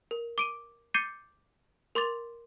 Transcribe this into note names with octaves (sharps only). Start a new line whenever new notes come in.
A#4
D6 D7 D#7
D6 G6 A6 C7 C#7 D#7
A#4 C6 D6 A6 F7